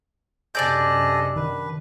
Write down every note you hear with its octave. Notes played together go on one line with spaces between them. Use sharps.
F#2 C3 D4 G#4 A4 D5 D#5 G6
D#3 B4